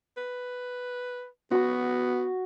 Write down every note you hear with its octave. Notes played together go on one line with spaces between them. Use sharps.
B4
B3 F#4 C#6